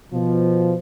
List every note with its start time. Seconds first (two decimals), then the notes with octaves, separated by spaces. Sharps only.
0.12 B2 F3